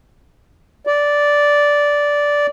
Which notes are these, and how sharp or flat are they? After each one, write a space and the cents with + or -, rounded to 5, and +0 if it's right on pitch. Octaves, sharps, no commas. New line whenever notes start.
D5 -10